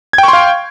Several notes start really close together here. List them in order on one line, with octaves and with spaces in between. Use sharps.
G#6 G5 C#6 C6 F5